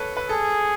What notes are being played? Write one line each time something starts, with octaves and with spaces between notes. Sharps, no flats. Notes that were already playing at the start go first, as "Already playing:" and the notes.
Already playing: A4 B4 C#5
B4
G#4 A4